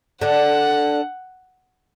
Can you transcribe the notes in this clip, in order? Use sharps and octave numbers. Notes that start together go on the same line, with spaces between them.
D3 D4 F#5